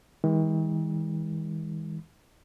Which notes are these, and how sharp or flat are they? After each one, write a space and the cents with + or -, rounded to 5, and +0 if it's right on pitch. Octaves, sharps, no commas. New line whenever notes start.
D#3 +45 G#3 -35